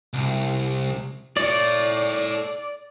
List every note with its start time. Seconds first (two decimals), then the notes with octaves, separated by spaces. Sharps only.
0.13 C2
1.37 A4 C#5 D5